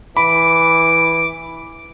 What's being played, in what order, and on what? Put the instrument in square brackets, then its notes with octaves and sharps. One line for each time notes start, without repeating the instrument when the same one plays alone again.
[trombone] E3 [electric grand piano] B5 [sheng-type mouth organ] D6